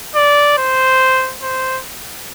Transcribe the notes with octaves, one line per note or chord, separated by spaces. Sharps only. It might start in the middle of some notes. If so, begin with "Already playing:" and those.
D5
C5
C5